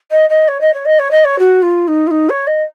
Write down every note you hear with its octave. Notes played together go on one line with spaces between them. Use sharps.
D#5
D#5
C#5
D#5
C#5
D#5
C#5
D#5
C#5
F#4
F4
D#4
F4
D#4
C#5
D#5